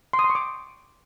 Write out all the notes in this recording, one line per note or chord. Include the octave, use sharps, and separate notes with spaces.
C6
D#6
C6
C#6
D6